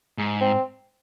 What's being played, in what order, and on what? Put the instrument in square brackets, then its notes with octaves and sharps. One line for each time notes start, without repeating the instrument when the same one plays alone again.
[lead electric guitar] G#2
[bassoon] C4